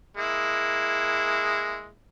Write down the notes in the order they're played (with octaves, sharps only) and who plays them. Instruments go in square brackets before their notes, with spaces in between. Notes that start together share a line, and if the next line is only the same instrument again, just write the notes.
[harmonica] G#3 A#3 E4